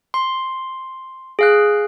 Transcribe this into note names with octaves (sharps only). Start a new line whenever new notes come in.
C6
G#4 F5 F#6